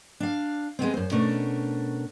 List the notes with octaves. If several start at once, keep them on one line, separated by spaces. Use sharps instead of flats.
D4 F5
G#3 A3 B3 C4
F#2 C5
B2 A3 C#4 D4 A#4